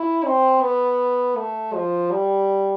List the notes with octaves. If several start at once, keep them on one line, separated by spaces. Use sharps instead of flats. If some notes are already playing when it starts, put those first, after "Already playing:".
Already playing: E4
C4
B3
A3
F3
G3